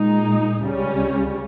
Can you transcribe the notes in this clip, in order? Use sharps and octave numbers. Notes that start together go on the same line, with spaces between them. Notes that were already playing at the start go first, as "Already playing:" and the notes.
Already playing: A#2 G#3 D#4
C#2 C#3 G3 C#4